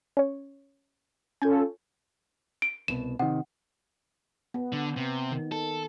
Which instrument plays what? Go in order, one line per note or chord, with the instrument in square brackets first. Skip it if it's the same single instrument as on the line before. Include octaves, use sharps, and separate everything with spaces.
[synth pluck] C#4 C#5
[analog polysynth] C#4 F4 A4 [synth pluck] G#5 G6 G#6
[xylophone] D7
[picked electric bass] C2 B2 [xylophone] E7
[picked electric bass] C3 D#3 [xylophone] F#5
[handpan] B3
[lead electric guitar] D3
C3
[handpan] D#3
[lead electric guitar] A4